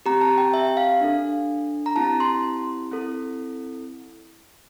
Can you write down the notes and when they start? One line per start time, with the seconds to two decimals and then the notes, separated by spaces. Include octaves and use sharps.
0.06 C4 G4 A#5
0.21 A5
0.38 G5
0.54 E5
0.77 F5
1.01 D4 A4
1.86 A#5
1.95 C4 E4 G4 A5
2.20 C6
2.91 C4 E4 A4